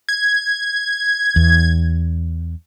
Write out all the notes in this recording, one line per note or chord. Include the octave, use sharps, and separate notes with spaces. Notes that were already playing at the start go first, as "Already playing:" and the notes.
G#6
E2